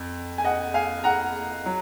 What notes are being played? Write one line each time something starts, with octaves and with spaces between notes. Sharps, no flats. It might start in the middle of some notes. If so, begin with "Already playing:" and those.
Already playing: F2
G#5
D#5 F#5
F5 G#5
F#5 A#5
F#3